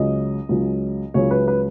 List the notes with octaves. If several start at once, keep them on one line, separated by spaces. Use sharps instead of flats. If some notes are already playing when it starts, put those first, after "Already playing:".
Already playing: C#2 C#3 F#3 D#5
C#2 C#3 F#3
C#2 C#3 F#3 C#5
B4
B4